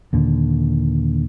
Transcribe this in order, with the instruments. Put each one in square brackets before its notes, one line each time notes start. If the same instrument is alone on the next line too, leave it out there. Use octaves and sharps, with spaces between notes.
[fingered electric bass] D#2 A#2 D3